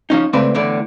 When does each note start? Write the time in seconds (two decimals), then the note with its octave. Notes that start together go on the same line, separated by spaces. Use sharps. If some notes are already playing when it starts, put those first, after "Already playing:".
0.10 F3 C#4 D#4
0.33 C#2 C#3 A3 C4 B4 D5
0.54 E2 A2 D3 D5